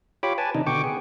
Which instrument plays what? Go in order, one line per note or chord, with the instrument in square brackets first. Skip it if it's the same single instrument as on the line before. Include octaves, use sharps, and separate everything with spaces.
[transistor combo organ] F4 G4 C#5 B5 D6
B4 G#5 A5
C3 D#3 D4 D#4
B2 D3 G5 C#6 D6
B3 G#4